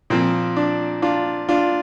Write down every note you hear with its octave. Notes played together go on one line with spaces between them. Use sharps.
A#2 F3 C4
D4
D4 F4
D4 F4